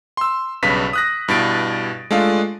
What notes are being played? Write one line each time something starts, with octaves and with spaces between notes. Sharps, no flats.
C6 E6
B1 G2 C#3 B4 B6
D#6 F#6 A#6
G2 B2 E4 A6 D7
G#3 A3 D4 F4